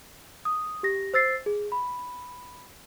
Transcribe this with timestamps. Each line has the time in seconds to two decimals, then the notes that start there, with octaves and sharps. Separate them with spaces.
0.45 D#6
0.83 G4 A#6
1.14 C5 E6 A6 C7
1.46 G#4
1.72 B5